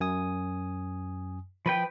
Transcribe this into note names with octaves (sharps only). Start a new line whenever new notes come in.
F#2 G#5 D#6
F3 B4 G5 B5